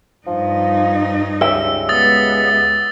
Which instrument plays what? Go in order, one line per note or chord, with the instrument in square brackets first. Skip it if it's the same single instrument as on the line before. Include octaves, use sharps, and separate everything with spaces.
[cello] G2 D#4 [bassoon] F3
[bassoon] C#2 [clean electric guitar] G4 D5 E5 [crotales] E6
[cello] G#3 B3 [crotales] D#6 A6